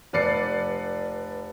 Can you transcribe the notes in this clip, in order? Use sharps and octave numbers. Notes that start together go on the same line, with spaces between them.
F1 B4 D5 C7 C#7